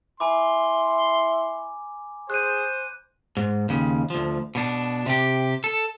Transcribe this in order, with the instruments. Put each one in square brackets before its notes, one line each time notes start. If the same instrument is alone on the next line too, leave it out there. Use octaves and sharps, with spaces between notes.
[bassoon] E4 [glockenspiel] G#5 B5 D6 [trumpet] C6
[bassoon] G#4 [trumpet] C5 [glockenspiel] F#6 D#7
[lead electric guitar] G#2
D#2 C#3
D2 F3
B2 D4
C3 G4
A4